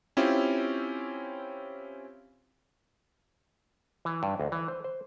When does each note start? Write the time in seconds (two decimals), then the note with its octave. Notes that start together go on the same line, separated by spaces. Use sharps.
0.17 C4 C#4 E4 F4 G4
4.05 E3
4.23 G2
4.40 D2
4.52 E3
4.68 C5
4.84 C5